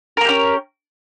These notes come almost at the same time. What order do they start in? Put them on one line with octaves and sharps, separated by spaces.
A#4 A#3 G4 C#4